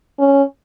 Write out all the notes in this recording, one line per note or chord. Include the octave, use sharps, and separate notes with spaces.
C#4